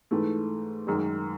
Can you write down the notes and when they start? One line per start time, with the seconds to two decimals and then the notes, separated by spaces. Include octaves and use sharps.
0.11 G#2 E3 A3
0.87 F#2 D#3 G#3